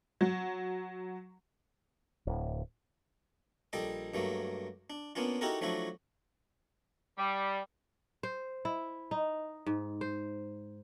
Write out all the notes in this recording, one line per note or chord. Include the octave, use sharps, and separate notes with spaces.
F#3
D1
A#1 G3 A4 D#5 D6
G2 F#3 A3 A#3
D4
A#3 B3 C#4 D4 F4
D#4 E4 F#4 G4 A4 A#4
F3 F#3 A3 D4 E4 F#4
G3
C5
E4
D#4
G#2
C5